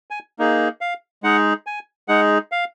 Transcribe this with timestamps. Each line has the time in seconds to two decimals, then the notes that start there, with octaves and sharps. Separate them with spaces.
0.10 G#5
0.39 A#3 D#4 G#4
0.81 F5
1.23 G#3 D#4 G#4 F#5
1.67 G#5
2.08 G#3 D#4 G#4 F#5
2.52 F5